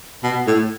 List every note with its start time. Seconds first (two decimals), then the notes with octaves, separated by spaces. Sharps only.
0.24 B2
0.47 A2